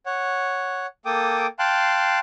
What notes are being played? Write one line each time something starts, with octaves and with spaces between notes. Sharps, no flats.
C#5 F#5
A#3 A4 G5 D6 D#6
F5 G5 A5 C6 F#6